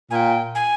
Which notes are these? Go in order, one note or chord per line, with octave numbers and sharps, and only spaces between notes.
A#2 G5 G#5
G#5